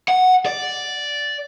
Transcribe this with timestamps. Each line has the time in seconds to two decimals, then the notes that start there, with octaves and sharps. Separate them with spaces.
0.08 F#5
0.46 D5